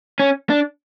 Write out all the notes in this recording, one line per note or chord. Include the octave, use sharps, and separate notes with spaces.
C#4
D4